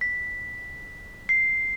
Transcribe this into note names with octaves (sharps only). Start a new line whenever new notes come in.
B6
C7